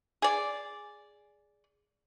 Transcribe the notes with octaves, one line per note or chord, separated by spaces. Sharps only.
G#4 D5